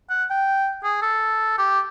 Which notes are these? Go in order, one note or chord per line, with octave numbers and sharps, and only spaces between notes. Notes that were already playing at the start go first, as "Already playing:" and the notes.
F#5
G5
G#4
A4
G4